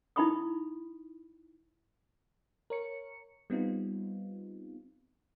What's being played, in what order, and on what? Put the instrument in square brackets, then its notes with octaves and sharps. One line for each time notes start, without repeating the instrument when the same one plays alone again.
[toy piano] D#4 E4 E5 B5 C#6 D#6
[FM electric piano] A#4 C#5 C#7
G3 B3 C4 D#4 F4